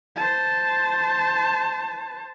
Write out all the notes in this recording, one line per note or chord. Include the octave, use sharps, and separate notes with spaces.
C5 A5